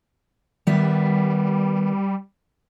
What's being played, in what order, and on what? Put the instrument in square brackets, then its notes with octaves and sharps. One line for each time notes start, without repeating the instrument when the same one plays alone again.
[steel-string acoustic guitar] D#3 B3 E5 [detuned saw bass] G3